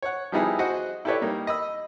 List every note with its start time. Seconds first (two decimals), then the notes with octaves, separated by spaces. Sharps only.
0.02 C#5 F#5
0.32 F3 G3 B3 D#4 E4 G#4
0.59 F#4 G#4 C5 D#5 F#5
1.05 E4 G4 A4 B4 C#5 D5
1.21 G3 A#3 D#4
1.47 D#5 B5 E6